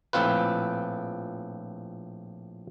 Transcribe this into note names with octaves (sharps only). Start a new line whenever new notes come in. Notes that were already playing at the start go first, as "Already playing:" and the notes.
A#1 A2 C4 F4 B4